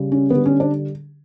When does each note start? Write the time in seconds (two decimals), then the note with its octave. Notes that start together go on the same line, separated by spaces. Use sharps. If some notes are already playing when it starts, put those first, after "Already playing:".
Already playing: C#3 G3
0.12 C#4
0.30 D3 G3 B3
0.46 C#4
0.60 D4